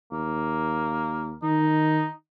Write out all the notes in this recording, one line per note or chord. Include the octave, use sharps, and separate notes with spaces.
D#2 A#3
D#3 D#4